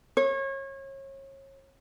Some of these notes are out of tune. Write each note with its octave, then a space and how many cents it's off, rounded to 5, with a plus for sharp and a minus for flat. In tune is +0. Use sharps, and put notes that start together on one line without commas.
C#5 -30